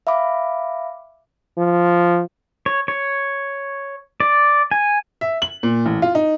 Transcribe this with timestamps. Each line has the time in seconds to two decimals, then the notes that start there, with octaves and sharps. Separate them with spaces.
0.07 E5 F5 B5 D6
1.58 F3
2.66 C#5
2.88 C#5
4.20 D5
4.71 G#5
5.21 E5
5.42 F#7
5.63 A#2
5.86 A1
6.02 F4
6.15 D#4